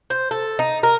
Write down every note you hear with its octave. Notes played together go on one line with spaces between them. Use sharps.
C5
A4
D#4
A#4